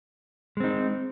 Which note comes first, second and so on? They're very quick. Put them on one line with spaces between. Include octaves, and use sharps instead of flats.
G#3 C4 D#4